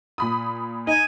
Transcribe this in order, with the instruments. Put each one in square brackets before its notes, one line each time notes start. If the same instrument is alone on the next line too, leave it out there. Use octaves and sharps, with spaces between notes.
[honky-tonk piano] A#2 B5 D#6
[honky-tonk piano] D#4 [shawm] G#5